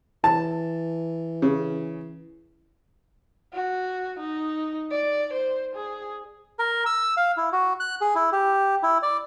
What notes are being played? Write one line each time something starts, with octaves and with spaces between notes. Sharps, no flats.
E3 A5
C#3
F#4
D#4
D5
C5
G#4
A#4
E6
F5
E4
F#4
F#6
G#4
E4
G4
E4
D5